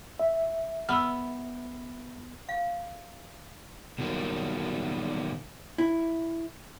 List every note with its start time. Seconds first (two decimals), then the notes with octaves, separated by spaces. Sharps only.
0.19 E5
0.89 B3 E6 F6
2.49 F5
3.99 B2 D#3 F#3 G3 A#3
5.78 E4